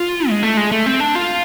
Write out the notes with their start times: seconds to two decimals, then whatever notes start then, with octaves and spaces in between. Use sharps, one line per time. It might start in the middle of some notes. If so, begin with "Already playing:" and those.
Already playing: F4
0.29 G#3
0.43 A3
0.57 G#3
0.71 A3
0.86 C4
1.00 D4
1.15 F4